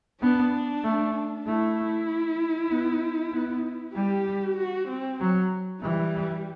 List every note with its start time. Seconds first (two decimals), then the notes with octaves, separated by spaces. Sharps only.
0.22 B3 D4
0.84 A3
1.46 A3 E4
2.70 B3
3.33 B3
3.95 G3 G4
4.57 F#4
4.88 C4
5.20 F#3
5.82 E3 G3